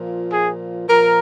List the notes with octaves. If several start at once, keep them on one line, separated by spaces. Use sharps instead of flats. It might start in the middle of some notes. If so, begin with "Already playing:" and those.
Already playing: A#2 F3
G#4
A#2 F3 A#4